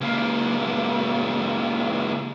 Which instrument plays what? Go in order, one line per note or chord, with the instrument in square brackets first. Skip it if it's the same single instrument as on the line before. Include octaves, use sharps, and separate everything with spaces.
[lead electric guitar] C#2 A#3